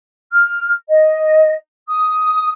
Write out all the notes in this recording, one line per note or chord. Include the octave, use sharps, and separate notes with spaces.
F6
D#5
D#6